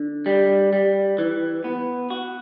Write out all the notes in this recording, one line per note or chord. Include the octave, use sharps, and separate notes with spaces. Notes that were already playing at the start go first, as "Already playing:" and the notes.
Already playing: D3
G3
G3
E3
B3
F#4